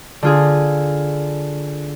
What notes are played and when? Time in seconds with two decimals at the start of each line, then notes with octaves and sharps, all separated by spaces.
0.23 D3 F4 G#4